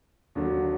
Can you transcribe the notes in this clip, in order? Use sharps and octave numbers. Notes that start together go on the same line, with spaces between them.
D#2 D3 F#3